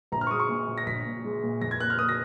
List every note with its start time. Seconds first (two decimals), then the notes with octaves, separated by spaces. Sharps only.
0.12 A#1 A#5
0.21 F6
0.27 C#6
0.31 G#3 D#6
0.40 C#6
0.49 A#2
0.68 A#2
0.78 A#6
0.87 A#1 B6
1.06 A#2
1.24 G#3
1.43 A#2
1.61 F2 A#6
1.71 G#6
1.80 A#3 F#6
1.90 F6
1.99 A#3 D#6
2.09 A#6